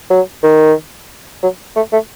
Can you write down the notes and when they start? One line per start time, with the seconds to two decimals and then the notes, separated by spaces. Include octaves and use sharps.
0.10 F#3
0.43 D#3
1.43 F#3
1.76 A3
1.93 A3